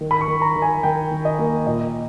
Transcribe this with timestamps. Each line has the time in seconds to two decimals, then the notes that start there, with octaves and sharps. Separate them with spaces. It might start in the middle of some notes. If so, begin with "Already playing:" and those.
0.01 D#3
0.11 B5
0.21 C#6
0.28 D#3
0.42 A#5
0.56 D#3
0.62 G#5
0.83 D#3 G5
1.11 D#3
1.25 D#5
1.39 A#3
1.67 A#2 D#5